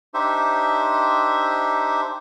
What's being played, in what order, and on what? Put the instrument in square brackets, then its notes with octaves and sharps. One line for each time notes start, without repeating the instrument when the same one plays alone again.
[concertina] D4 D#4 G4 C5 E5